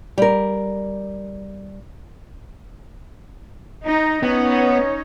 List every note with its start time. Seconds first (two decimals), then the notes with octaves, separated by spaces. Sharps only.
0.18 G3 A#4
3.85 D#4
4.23 B3 C#4 D#4 C#5